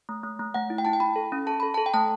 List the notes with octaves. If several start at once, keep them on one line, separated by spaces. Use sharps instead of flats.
A3
A3
A3
A3 F#5
E4
G5
E4 A5
G5
E4 B5
A4
C#4
A4 A5
A4 B5
A5
A4
G5
A3 A5